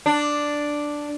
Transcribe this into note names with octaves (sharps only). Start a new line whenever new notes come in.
D4